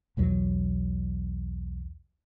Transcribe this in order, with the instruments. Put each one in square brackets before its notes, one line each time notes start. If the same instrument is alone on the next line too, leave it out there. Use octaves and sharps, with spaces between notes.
[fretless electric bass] B1 E2 F#3